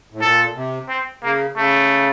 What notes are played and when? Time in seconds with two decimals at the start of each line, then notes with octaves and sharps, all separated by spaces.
0.12 A2
0.21 A#2 A4
0.55 C3
0.89 C4
1.23 C#3 A#3
1.57 C#3 A3